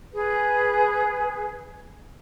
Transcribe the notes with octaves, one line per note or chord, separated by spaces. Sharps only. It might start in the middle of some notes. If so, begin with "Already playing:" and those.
G#4 B4